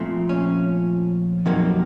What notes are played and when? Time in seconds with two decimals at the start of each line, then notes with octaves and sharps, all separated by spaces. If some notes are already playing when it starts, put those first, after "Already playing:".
Already playing: A#2 F3 A3 C4
0.29 C#4
1.46 F2 C3 D#3 F#3 A#3 C4